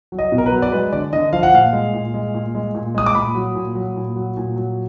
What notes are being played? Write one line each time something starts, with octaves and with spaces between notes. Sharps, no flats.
F#3
D#5
B2
A#4
B4
F#3
D5
G#3 B4
D3 D5
D3 D#5
F3 F5
F#5
A#2 F5
G#3
A#2
G#3
A#2
G#3
A#2
G#3 D#6
D6
A#2 B5
F#3
A#2
F#3
A#2
F#3
A#2
F#3